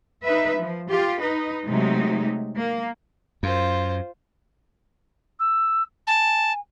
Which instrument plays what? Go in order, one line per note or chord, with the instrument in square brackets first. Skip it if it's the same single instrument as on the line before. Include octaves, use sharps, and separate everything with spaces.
[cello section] D#4 B4 E5
F3
F4 G4
D#4 B4
C3 F#3 G#3 A3 D#4
A#3
[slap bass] F#2 [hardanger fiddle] F4 C5
[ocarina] E6
[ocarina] G#5 [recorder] A5